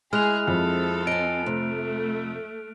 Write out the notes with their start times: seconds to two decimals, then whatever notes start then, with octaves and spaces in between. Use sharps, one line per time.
0.13 G#3 E4 G#4 F6 F#6 F7
0.47 F2 C4 A4
1.07 D#5 G#5 D7
1.46 C3 A3